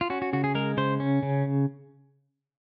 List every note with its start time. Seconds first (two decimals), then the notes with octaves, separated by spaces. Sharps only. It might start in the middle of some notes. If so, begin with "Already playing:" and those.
0.01 F4
0.10 C#4 F#4
0.22 F#4
0.33 C#3 F#4
0.44 G#4
0.55 G#3 A#4
0.77 C#3 C5
1.00 C#4
1.23 C#3